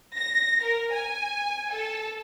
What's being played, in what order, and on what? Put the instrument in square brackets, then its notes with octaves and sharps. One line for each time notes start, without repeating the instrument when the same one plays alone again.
[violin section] A#6
A#4
G#5
A4